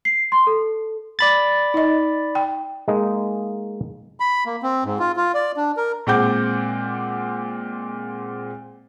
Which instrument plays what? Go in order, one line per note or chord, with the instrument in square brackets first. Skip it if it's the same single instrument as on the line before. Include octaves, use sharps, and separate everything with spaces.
[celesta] C7
C6
A4
[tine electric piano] D5 B5 A6
[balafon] D#4 D#5
G5
[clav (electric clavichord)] G#3 A#3 D#4
[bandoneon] B5
A#3
C4
G#2
F4
F4
D5
D4
A#4
[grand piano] A#2 G#3 C4 F#5 D6 G6